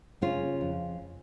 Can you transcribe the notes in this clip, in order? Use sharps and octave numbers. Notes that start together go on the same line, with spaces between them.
C#3 C#4 F4
F2